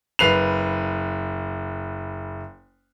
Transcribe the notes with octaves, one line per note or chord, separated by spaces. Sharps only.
F#1 B4 C7 F7